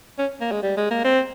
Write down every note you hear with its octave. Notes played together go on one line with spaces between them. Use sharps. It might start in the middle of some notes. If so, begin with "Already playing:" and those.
C#4
A#3
G#3
G3
G#3
A#3
C4